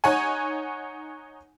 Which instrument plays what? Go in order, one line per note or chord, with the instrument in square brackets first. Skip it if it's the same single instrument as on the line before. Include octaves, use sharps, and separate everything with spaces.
[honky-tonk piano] D#4 C#5 F#5 G#5